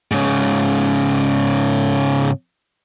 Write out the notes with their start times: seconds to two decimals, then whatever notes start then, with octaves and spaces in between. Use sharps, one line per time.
0.11 G#2 C#3